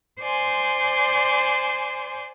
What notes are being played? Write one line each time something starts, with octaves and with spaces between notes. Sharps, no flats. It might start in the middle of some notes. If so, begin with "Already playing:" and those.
C5 D5 G#5 C6